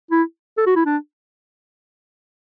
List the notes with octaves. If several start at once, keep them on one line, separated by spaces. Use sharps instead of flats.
E4
A4
F#4
E4
D4